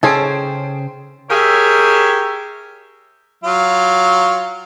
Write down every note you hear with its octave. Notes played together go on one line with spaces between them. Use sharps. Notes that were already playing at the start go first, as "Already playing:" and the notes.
C#3 C#4 G#4 A4 C5 G5
G4 G#4 A#4 C#5 E5
F#3 F4